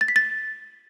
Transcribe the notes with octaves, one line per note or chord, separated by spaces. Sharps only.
A6
B6
A6